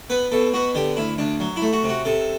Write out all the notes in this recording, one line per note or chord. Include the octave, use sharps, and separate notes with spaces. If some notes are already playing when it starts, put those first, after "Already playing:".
B3 B4
B2 A4
B3 F#4
D3 G4
D2 E4
D2 D4
F#3
E4
A3
F#4
C3
F#4
C3 A4